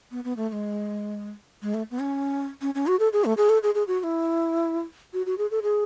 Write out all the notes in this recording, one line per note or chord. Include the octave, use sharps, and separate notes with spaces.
B3
B3
A3
A3
G#3
G#3
A3
B3
C#4
C#4
C#4
F#4
A4
G#4
A3
G#4
A4
G#4
G#4
F#4
F#4
E4
F#4
F#4
G#4
A4
G#4